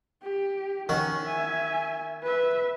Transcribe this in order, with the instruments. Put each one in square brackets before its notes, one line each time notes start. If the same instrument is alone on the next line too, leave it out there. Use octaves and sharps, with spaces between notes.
[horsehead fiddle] G4
[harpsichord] D#3 F#4 [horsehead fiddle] C#4
[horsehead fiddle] E5 G#5
B4 E5